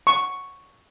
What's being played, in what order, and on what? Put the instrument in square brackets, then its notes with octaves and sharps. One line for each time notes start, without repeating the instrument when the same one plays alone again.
[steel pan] C#6